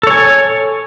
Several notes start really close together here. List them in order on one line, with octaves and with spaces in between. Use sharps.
A4 C#5 G#5